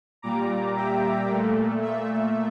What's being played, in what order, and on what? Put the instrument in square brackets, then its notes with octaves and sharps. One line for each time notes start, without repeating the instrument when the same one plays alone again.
[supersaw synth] A#2 G3 A#5 D6
E5 G5
A#2 A3
E5